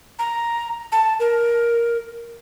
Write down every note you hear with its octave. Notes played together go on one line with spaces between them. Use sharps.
A#5
A5
A#4